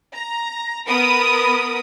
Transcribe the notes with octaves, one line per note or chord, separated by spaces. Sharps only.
A#5
B3 A#4 B5 D#6